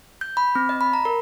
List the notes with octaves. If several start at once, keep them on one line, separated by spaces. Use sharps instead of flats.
G6
B5
C4
D#5
B5
A#5
A#4